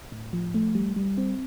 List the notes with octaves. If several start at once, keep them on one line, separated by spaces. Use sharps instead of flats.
A2
F3
A3
G3
G3
C4